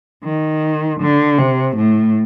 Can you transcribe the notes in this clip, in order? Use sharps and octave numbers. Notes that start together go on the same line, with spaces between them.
D#3
D3
C3
A2